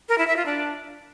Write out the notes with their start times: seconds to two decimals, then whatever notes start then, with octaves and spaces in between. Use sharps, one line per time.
0.09 A#4
0.18 E4
0.27 E5
0.37 F4
0.46 D4